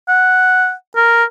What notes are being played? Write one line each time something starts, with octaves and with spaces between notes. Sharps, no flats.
F#5
A#4